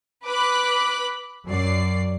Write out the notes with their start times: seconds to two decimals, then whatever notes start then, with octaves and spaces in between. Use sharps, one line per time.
0.24 B4 B5 D6 F#6
1.47 F#2 D5 C7